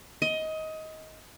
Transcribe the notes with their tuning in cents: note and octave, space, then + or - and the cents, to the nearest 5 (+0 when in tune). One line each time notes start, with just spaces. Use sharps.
D#5 +20